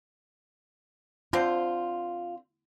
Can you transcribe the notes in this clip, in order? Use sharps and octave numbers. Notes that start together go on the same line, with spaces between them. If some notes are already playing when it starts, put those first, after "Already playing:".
D3 C4 F4 C5